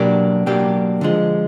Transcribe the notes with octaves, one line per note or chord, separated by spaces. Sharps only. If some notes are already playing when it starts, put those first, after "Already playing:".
Already playing: B2 F#3 A#3 D4 G4
B2 F#3 A#3 D4 G4
D3 F3 G#3